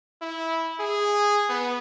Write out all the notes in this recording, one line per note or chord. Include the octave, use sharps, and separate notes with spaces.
E4
G#4
B3